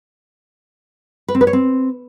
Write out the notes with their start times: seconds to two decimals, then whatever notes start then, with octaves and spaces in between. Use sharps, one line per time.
1.28 B4
1.35 C4
1.41 B4
1.47 C#5
1.53 C4